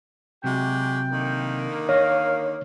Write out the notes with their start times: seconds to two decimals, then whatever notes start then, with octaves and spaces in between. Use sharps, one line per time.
0.44 C3 F#3 G#3 F#4 G4 G5
1.10 D3 D#3 A#3
1.89 C#5 D#5 F5